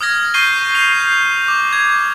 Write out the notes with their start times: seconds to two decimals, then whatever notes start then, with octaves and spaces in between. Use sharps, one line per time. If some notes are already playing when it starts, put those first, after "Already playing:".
0.01 D#6 F6 G#6 A#6
0.34 C#6 G6 C7 D#7 G7
0.75 C7 F7
1.00 G6
1.48 D6
1.73 G#6